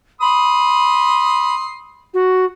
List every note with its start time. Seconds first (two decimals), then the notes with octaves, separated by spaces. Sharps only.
0.21 B5 C6 D#6
2.14 F#4